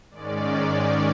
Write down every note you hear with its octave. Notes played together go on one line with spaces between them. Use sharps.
G#2 D#3 G#3 C#4 D5